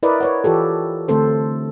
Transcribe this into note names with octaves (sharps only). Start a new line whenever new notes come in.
E4 A#4 B4 D5 D#5
B4 C#5 F#5
E3 F4 G4 A4
D3 A3 C4 A4 C5